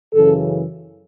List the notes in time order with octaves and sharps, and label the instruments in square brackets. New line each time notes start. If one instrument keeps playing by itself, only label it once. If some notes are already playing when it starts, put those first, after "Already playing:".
[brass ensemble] F#2 C#3 E3 A4